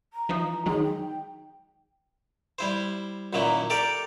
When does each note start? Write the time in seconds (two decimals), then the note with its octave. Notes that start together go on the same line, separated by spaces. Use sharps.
0.13 A#5
0.29 E3 F3 D#4
0.66 D#3 F#3 G#3 D#4
0.84 G5
2.59 G3 E4 C5
3.33 F#2 A#2 D#3 F#3 A#3 E4
3.70 G4 A4 A#4 D5 G5